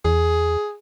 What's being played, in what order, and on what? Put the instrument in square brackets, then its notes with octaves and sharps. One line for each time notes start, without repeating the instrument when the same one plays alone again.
[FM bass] E2 [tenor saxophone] G#4